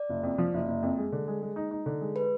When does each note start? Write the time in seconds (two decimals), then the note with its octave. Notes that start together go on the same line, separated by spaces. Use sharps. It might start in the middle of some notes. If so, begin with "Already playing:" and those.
Already playing: D5
0.10 F#1
0.23 F2
0.38 F3
0.54 F#1
0.68 F#1
0.83 F2
0.98 G#3
1.12 D3
1.27 G#3
1.42 G#3
1.56 D#4
1.71 D#4
1.86 D3
2.01 G#3
2.16 B4